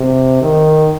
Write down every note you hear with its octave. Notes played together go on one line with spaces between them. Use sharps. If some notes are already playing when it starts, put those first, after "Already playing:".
Already playing: C3
D#3